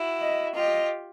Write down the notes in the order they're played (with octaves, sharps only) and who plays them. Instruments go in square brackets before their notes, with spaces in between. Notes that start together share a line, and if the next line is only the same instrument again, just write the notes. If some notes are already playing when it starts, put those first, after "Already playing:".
Already playing: [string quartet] E4 F#4
[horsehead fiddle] D#5
[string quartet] F4 G4 [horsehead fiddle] D#5